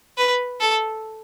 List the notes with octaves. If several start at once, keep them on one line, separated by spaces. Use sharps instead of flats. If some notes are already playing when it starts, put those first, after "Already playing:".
B4
A4